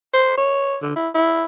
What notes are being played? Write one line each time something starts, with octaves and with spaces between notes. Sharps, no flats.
C5
C#5
D3
E4
E4